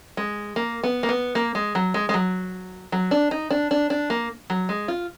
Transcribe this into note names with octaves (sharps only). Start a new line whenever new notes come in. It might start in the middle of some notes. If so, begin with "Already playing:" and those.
G#3
A#3
B3
A#3
B3
A#3
G#3
F#3
G#3
G#3
F#3
F#3
D4
D#4
D4
D4
D4
A#3
F#3
G#3
F4